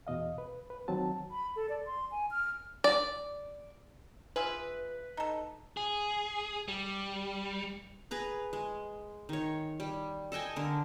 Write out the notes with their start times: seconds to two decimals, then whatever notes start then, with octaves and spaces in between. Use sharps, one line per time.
0.07 E2 B2 D#5 F5
0.38 B4
0.70 B4
0.88 D#3 F#3 C4 A5
1.31 B5
1.56 A4
1.69 D5
1.86 C6
2.11 G#5
2.31 F6
2.84 D5
4.36 F4 G#4 B4 E5
5.17 D#4 A4
5.77 G#4
6.68 G3
8.11 G#4 B4 A#5
8.53 G#3
9.29 D#3 C#5
9.80 G3
10.32 A4 D#5 G5 G#5
10.56 D3 A#4